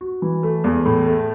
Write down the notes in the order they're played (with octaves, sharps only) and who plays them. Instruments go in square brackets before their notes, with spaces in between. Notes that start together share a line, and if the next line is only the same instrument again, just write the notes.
[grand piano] F#4
E3
A3
E2
A2
A3